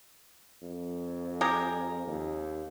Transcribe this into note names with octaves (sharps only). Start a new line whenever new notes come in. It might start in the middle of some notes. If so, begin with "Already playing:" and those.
F2
G4 G#4 A#4
D#2